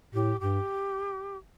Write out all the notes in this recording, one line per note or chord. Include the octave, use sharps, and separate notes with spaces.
A2 G4
G2 G4